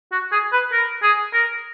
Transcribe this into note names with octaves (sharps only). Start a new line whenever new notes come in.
F#4
G#4
B4
A#4
G#4
A#4